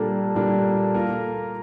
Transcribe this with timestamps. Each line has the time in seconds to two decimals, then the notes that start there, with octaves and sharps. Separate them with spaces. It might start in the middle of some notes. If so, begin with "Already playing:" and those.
Already playing: A#2 G3 A#3 D4 A4
0.35 A#2 G3 A#3 D4
0.95 A#3 F4 A#4